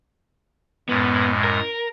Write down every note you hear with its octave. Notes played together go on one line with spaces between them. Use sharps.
F#2 A2 G#3 B3
A#4